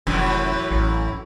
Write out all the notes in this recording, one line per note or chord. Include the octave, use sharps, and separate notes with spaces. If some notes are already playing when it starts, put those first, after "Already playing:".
F1 F#2 A2 E3
A1